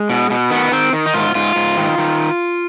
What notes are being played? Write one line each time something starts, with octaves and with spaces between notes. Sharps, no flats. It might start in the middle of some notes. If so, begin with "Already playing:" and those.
Already playing: G#3
B2
B2
D#3 B3
D#3 C4
D#3
D#4
G#2 F4
G#2 F4
G#2
D#3
D#3